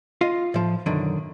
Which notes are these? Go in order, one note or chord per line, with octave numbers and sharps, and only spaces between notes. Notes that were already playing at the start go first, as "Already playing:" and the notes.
F4 D#5 F5
A2 F3
B1 F#2 D3 D#3